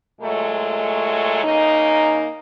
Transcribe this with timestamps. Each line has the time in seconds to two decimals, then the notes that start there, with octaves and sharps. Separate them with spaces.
0.21 A#2 F#3 G#3 A3
1.43 C#3 A#3 D#4